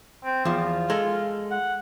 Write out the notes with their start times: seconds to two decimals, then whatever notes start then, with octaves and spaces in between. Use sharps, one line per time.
0.24 C4
0.45 E2 F3 F4
0.90 G#3 A4
1.51 F#5